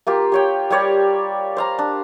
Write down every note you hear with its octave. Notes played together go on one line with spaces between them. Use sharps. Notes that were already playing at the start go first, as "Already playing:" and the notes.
A#3 F4 G4
G4 C#5 G5
G3 G4 C#5 D5
C5 F5 A#5
D4